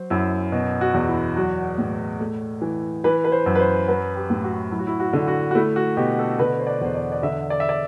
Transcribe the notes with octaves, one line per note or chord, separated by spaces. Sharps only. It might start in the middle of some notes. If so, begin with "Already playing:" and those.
Already playing: F#3 C5
F#2 E4
B2
F#4
E2
E4
F#3 F#4
A2
A3
E3
E3 B4
B4
C5
F#2
B4
C5
F#3 B4
G4
A2
F#4
F#3 E4
F#4
E4
F#4
D3
F#4
F#4
A3 E4
F#4
B2 G4
A4
D3 B4
C5
D5
E2 C5
D5
D5
D3 E5
D5
E5
D5